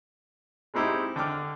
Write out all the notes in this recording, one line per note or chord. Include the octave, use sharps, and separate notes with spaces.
G#3 C4 D#4 E4 G4
D3 G5 D6 F6